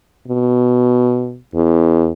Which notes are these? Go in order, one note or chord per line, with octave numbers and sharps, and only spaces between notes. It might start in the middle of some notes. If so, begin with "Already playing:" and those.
B2
E2